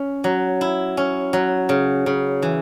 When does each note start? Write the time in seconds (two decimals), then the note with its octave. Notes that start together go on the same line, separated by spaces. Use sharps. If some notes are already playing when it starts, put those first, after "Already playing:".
Already playing: C#4
0.24 F#3
0.61 E4
0.97 C#4
1.33 F#3
1.69 C#3
2.06 C#3
2.42 E3